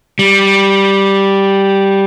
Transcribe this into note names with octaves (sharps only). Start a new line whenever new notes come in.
G3